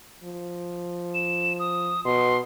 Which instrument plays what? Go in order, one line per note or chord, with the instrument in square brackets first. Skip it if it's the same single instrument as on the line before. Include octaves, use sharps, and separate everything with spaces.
[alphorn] F3
[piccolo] E7
D#6
[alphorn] B2 [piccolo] C6